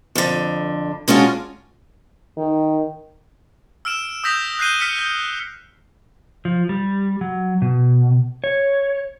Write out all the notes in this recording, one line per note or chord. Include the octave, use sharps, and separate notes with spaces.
F2 D3
G#3 C#4 D4 F4 F#4
D#3
E6 F6 D7 E7
D#6 E6 G6 A#6 B6 F7
F#6 G6 C7 D#7 G7
F6 B6 C#7 D#7
G6
F3
G3
F#3
B2
C#5